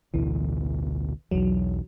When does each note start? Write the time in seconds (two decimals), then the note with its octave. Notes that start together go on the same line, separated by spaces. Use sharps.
0.14 A1 D2 B2 E3
1.31 B1 E2 F#3